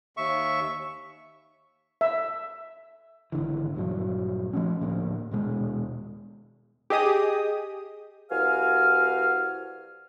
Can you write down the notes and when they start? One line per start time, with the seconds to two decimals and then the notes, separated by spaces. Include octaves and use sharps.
0.17 D#2 E5 C#6
2.01 E5
3.32 G#1 D2 D3 E3
3.74 A#1 G2 F#3
4.53 F3 A3 C#4
4.80 D2 A2 F3 A#3
5.31 D#1 B2 G#3
6.90 G4 G#4 D#5 D#6
8.31 C2 F#4 B4 F5 G#5 F6